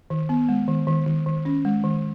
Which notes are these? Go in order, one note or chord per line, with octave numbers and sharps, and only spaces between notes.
D#3
B3
G#3
D#3
D#3
D#3
D#3
C#4
G#3
D#3